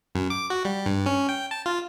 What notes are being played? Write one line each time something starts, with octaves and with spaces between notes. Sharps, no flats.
F#2
D6
F#4
G3
G2
C#4
G5
A5
F4